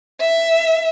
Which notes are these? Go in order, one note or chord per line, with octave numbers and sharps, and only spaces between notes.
E5